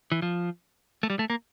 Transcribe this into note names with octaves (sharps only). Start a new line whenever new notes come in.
E3
F3
A3
G3
A3
A#3